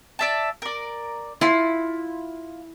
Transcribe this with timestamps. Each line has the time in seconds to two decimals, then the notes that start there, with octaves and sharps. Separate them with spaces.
0.19 D5 E5 A5
0.62 A#4 D5
1.41 E4 F4 C6